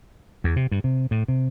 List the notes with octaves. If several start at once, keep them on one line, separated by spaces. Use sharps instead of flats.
E2
C3
G2
C3
A2
C3